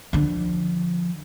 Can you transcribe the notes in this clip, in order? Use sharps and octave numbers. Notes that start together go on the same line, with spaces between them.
D3 F3